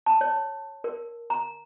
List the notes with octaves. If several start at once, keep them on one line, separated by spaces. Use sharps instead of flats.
A5
C#5
A#4
A#5